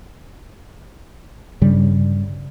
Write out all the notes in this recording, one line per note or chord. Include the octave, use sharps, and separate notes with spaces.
G2 C#3 G3